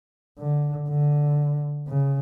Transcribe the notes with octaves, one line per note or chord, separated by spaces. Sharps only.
D3
D3
C#3